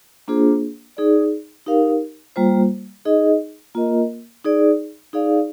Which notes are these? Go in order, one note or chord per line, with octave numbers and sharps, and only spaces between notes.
A#3 D4 F4 G#4 C5
D#4 G#4 D5
D#4 G4 A#4 F5
G3 A#3 F4 C5
D#4 G#4 D#5
A#3 F4 A#4 D#5
D#4 G#4 D5
D#4 G#4 D5 F5